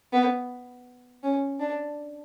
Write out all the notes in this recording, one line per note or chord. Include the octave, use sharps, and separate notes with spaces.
B3
C#4
D4